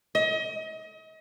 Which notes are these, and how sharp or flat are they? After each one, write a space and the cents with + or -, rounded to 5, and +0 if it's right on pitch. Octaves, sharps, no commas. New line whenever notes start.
D#5 +35